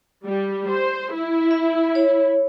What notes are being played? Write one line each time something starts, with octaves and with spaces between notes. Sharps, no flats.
G3 G4
C5
E4
E5
C#5